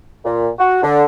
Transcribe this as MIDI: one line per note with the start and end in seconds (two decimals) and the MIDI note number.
0.25 0.48 46
0.59 0.78 66
0.83 1.05 50